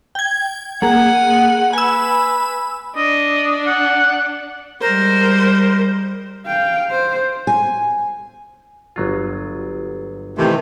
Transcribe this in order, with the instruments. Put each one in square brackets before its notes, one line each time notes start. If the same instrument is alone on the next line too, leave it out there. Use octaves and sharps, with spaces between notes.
[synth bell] G5 G#6
[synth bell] A#3 G#4 [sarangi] F#5
[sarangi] B4 [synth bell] G#5 E6
[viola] D4 [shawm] D#5
[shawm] F#5
[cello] G3 G#3 [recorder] A#4 [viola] C5
[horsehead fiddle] F5 G5
C5
[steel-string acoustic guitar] G#5
[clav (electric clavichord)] G1 F#3 F4
[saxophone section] C3 [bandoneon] D#3 E3 A3